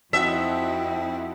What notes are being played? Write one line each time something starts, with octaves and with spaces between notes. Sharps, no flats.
F2 F3 C4 D#4 E4 F#4 E5